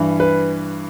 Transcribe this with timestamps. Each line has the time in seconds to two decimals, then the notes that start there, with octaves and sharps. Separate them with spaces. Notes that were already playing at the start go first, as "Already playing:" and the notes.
Already playing: G2 E3
0.20 B4